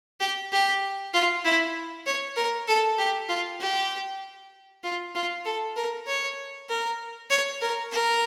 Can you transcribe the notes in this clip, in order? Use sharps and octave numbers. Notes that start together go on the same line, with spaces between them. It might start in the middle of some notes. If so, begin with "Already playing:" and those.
G4
G4
F4
E4
C#5
A#4
A4
G4
F4
G4
F4
F4
A4
A#4
C#5
A#4
C#5
A#4
A#4